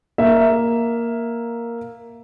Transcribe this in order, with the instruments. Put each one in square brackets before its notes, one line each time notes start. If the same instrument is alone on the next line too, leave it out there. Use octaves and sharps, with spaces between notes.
[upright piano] A#3 E5